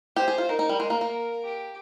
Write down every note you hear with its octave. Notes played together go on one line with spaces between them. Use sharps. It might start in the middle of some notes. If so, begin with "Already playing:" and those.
G4 C5
G#4
F4
D#4 A#4
D#4
G3
G#3
A#3
A#3
G4